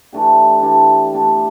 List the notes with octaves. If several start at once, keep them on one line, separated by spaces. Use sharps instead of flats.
E3 A3 D4 G4
E3 A3 D4 G4
D3 A3 D4 G4